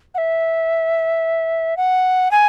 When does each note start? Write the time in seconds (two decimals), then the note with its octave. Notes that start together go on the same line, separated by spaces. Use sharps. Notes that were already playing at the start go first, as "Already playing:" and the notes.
0.14 F#5
0.18 E5
1.77 F#5
2.31 G#5